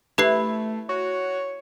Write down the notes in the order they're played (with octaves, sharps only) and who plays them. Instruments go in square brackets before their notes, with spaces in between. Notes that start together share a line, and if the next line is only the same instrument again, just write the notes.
[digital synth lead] A3 [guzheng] E4 [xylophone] G4 B4 C7
[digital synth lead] F#4 [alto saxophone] C#5